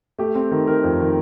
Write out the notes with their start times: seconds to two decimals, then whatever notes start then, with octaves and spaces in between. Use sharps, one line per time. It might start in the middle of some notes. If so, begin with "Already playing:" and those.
0.19 A3 G4
0.35 C4
0.51 D#3
0.67 D#3 A#4
0.84 F2
1.00 D#3